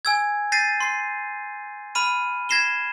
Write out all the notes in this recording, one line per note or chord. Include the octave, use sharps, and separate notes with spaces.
G#5 E6 G#6
G6 A6 A#6 C7 D#7
C6 C7
B5 F6 D#7
G#6 A#6 C7 E7 G7